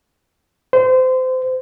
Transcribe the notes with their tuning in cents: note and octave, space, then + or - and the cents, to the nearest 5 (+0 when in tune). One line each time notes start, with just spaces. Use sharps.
C5 -25